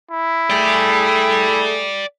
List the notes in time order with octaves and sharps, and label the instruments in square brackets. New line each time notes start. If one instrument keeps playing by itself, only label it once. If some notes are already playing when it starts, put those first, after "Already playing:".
[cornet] E4
[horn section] A3 G#4 [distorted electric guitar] D5 G5